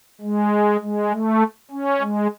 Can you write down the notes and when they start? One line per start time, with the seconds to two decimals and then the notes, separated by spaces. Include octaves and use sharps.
0.21 G#3
0.81 G#3
1.12 A3
1.71 C#4
2.01 G#3